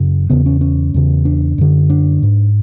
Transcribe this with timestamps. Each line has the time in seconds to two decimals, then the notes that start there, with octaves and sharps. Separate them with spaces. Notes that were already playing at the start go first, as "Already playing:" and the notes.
Already playing: F#2 C#3
0.30 E2 C#3 B3
0.46 C#4
0.61 C#4
0.94 E2 C#3
1.25 D4
1.58 F#2 D3
1.90 D4
2.23 G#2